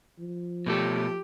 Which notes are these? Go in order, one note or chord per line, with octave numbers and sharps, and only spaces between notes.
F3
B2 A3 G4 A4